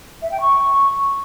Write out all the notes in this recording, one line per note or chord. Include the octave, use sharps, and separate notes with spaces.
E5
G5
C#6